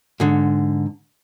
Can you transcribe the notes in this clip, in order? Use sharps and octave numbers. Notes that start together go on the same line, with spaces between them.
G#2 D3